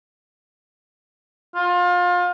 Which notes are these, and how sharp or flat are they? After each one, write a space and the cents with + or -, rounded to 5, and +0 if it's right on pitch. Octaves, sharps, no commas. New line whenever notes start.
F4 +30